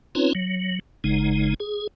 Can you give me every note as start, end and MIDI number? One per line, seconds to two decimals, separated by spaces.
0.15 0.33 60
0.15 0.33 61
0.15 0.33 63
0.15 0.33 65
0.15 0.33 71
0.15 0.33 73
0.35 0.79 54
1.04 1.54 30
1.04 1.54 49
1.04 1.54 56
1.04 1.54 63
1.60 1.87 68